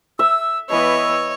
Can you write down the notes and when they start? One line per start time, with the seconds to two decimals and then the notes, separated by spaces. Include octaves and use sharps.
0.19 E5 E6
0.70 E3 B3 C#5 D#5